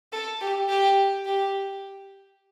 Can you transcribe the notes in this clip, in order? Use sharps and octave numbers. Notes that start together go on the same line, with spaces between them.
A4
G4
G4
G4